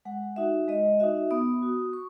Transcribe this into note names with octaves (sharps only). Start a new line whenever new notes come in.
G#3 F#5
D#4 F#4 E5
G#3 D#5
D#4 F#4 E5
B3 D#6
F#4
C#6